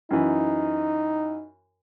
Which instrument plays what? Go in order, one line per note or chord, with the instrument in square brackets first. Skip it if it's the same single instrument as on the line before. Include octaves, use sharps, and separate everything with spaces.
[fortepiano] F#2 E3 [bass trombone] D#4